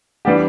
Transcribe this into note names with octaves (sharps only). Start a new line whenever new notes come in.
E3 G3 B3 D4 G4